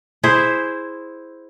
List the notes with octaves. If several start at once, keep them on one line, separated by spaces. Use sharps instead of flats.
E4 G#4 C5 E5